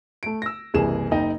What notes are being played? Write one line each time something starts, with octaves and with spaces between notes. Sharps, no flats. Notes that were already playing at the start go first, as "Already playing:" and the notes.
A3 D7
E6 A#6
F#1 C2 E3 G#4 E7
F#1 D#4 D#5 G5